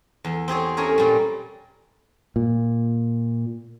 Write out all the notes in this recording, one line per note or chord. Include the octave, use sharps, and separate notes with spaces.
E2
C4 G4 G#4 C#5
A3 C#4 G#4 A#4 C#5
A#2 G3
A#2